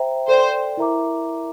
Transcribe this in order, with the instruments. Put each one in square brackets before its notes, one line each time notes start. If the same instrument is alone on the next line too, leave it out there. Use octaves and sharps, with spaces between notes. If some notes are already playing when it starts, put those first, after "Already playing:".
Already playing: [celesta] C5 E5 G5 A#5
[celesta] A4 D5 G5 [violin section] C5
[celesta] E4 A#4 E5 A#5 D6